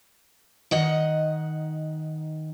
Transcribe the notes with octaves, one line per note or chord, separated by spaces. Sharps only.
D#3 D#5 F#5